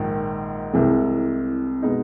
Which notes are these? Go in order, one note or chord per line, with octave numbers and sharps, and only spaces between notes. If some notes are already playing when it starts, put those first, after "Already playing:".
Already playing: A#1 G#2 D#3
C2 C3 E3 G#3
B2 G#3 B3 D#4